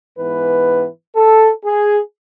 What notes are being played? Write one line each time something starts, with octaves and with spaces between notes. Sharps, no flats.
G#2 E3 B3 B4
A4
G#4